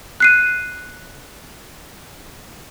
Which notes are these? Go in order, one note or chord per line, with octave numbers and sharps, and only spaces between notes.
F#6 C7 D#7